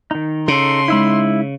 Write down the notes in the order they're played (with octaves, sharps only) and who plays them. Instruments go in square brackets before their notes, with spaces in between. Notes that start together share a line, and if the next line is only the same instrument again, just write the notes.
[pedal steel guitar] D#3 D#4
[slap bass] C#3 [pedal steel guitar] D#4 A4 [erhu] C6
[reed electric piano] G#3 D#4 [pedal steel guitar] E4 E5 B5